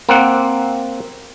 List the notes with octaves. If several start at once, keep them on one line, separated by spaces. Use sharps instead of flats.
A#3 C4 F#5